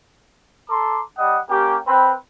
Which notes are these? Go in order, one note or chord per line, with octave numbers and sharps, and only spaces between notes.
A4 A#5 C6 D6
G3 D#5 F#5 D#6
A#3 C#4 G4
C4 B4